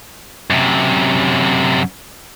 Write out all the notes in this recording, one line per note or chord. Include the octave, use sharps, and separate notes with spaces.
F#2 C3